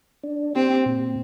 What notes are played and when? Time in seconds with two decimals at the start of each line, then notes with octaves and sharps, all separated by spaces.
0.23 D4
0.55 C4 G4
0.86 A#2